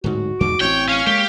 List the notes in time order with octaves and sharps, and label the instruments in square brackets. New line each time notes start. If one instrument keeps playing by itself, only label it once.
[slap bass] D1 G#2 [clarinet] F#4
[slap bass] E2 G#2 B2 [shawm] D6
[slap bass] A1 C4 [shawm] C#5 [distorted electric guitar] G5
[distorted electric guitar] C#4 [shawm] C#5 [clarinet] F5
[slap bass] G#3 A#3 [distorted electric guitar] G4